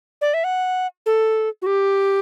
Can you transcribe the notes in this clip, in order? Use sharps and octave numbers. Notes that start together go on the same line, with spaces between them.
D5
E5
F#5
A4
F#4
G4